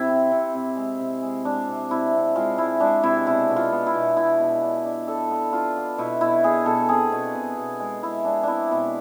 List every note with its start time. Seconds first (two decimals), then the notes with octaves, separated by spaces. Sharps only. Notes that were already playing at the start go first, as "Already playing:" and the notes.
Already playing: C3 E4
0.09 C4
0.32 C3
0.54 C3
0.76 G#3
1.00 C3
1.22 G#3
1.45 G#3 D4
1.68 C3
1.91 C3 E4
2.13 C3
2.36 G#3 F4
2.58 G#3 E4
2.80 G#3 D4
3.03 C3 E4
3.26 B2 E4
3.50 B2
3.56 F4
3.72 B3
3.87 E4
3.95 B2
4.17 B2 E4
4.40 B2
4.63 D4
4.86 D4
5.07 D4 A4
5.30 B3
5.53 D4 F4
5.76 B3
5.98 B2 E4
6.21 B2 E4
6.44 B3 G#4
6.66 B2 A4
6.89 C4 G#4
7.12 B2
7.34 B2
7.57 B2
7.80 G#3
8.03 G#3 E4
8.25 G#3 D4
8.43 C4 D4 E4
8.71 B2 E4